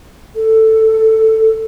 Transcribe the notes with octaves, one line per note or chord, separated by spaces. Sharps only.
A4